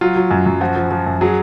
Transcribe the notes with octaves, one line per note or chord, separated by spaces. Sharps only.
F#3 F4
F#3
F#2
F#2
F3 F#4
F3
F3
F#2
F#3 G#4